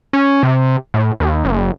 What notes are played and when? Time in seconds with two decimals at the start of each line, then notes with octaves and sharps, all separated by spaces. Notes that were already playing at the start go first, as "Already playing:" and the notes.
0.13 C#4
0.43 C3
0.94 A2
1.20 D#2
1.45 F#1